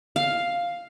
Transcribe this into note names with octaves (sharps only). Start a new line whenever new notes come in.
F5